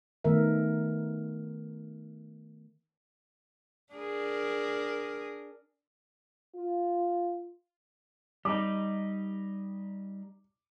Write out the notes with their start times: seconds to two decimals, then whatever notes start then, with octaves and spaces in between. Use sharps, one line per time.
0.24 D#3 A3 B3 A#4 E5
3.93 D4 G#4 A#4
6.56 F4
8.45 G3 D#4 D6